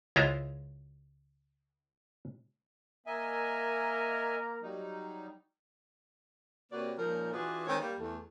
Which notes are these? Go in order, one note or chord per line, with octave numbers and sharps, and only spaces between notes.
C#2 G#3 E4 F4 C5 A#5
A#3 A#4 D#5 E5 G#5
F#3 G3 D#4
C3 A#3 F#4 B4 C#5 D5
A#2 F3 G#3 C#4 D#4 A#4
E3 D4 F4 F#4 G#4 B4
D#3 G#3 C4 B4 C#5
G3 A#3
E2 A3